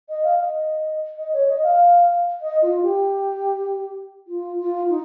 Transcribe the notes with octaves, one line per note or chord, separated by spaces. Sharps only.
D#5
F5
D#5
D#5
C#5
D#5
F5
D#5
F4
G4
F4
F4
D#4